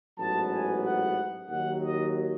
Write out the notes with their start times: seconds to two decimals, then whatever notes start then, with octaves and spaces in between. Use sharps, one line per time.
0.19 A1 G#2 F#3 B3 A5
0.52 G#5
0.85 F#5
1.50 D#2 D#3 F#3 F#5
1.82 D#5